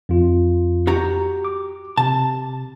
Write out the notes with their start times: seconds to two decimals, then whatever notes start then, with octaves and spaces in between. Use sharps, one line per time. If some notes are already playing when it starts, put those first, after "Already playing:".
0.09 F2 F4
0.87 F#4 G4 A#5
1.45 D6
1.97 C3 A5